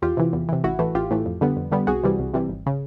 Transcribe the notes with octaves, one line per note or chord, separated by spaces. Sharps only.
E2 F4 G4
C3 E3
E2
C3 E3
A1 E4 F#4
A2 E3 A3
A1 F4 G4
A2 E3 A3
F2
D3 G3 B3
F2
D3 G3 B3
C2 F#4 G#4
C3 E3 G3
C2
C3 E3 G3
G#1
C#3